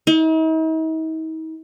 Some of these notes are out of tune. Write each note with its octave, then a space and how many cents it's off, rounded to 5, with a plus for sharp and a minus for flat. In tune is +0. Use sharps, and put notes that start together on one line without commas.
D#4 +45